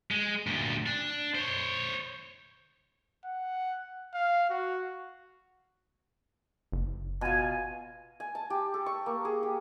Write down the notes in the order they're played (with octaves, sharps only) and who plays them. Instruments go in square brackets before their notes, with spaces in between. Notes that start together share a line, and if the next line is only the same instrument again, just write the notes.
[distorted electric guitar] G#3
D2 A#2
D4
C5 C#5
[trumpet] F#5
F5
F#4
[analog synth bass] F#1
[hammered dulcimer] B2 F4 [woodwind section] G#5
[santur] G#5
A5
G4
A4
C#6
A#3
G#4
G4